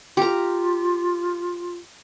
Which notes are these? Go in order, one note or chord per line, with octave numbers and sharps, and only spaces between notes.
F4 G4 A#5